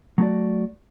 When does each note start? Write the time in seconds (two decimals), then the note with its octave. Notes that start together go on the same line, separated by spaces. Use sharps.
0.18 F#3 A3 F#4 D5